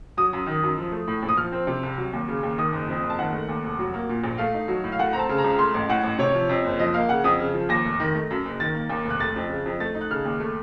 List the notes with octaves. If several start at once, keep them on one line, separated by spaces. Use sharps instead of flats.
F#3 D#6
F#2
D#3
F#2
F3
A3
A2
A#1
D#6
F3 F6
C4
C3
C2
F#3
D#2
C#3
D#2
D#3 D#6
F#1
F2
F#1
A5
D#3 F#5
A3
D#2
F1
F#3
A#3
A#2
A#1
A3 F5
D#4
F#3
A2
F5
A3 F#5
C4 A#5
A5
C#3
A#5
C#2
A3 C6
A1
A2 F#5
A1
C3 C#5
F3
F2
F#1
F3 D#5
A#3 F5
C#3 F#5
F2 D#6
C#3
F3
D#2 A#6
F1
D#3
A3
F#2
F#1
D#3 A6
A#3
D#2
F1
F#6
A3 A6
F2
C#3
F2
A3 A6
D#4
F#6
C#3 F6
D#2
A3